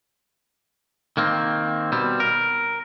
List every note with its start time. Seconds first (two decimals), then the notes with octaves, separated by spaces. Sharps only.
1.17 D#3 A#3 C4
1.92 B2 G3 C4
2.20 A#4